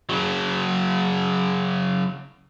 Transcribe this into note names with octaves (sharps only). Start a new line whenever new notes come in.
C#3 F#3